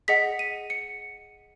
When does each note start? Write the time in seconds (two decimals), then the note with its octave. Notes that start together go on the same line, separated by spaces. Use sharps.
0.08 G#4 D#5 F#5 B6
0.39 D#7
0.70 C#7